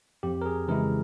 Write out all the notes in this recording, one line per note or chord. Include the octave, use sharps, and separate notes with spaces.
F2 G4
A#4
G#4
C#3 E3 G#3 E4 A#4